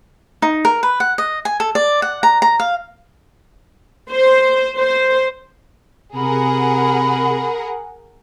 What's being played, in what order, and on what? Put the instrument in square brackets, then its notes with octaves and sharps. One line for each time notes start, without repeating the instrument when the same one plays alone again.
[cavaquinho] D#4
A#4
B4
F#5
D#5
G#5
A4
D5
F#5
A#5
A#5
F5
[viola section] C5
C5
[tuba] C3 [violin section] G#4 A#4 F#5 [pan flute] B5